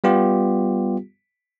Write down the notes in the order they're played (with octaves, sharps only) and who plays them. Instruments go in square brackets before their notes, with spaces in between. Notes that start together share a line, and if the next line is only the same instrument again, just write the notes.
[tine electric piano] G3 B3 F4 G4